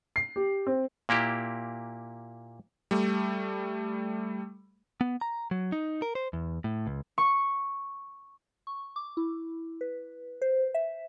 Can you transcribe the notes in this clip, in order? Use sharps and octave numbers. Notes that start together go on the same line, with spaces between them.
C7
G4
C4
A#2 A#3 E4 G4
G3 A3
B3
A#5
F#3
D#4
A#4
C5
E2
A2
C#2
C#6
C#6
D6
E4
B4
C5
E5